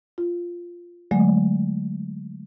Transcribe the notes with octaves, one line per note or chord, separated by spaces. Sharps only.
F4
D3 F#3 G#3 A3